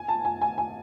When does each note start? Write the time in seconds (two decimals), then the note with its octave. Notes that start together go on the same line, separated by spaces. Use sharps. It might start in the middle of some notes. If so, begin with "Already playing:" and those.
Already playing: G#5
0.08 A5
0.25 G#5
0.41 G#5
0.58 G#5